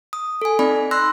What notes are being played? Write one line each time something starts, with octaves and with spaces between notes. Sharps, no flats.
D#6
A4 G#5
C4 D#4 D5 B5
C6 E6 F#6 A#6